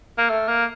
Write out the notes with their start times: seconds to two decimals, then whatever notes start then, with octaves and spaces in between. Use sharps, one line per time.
0.18 A#3
0.29 A3
0.48 A#3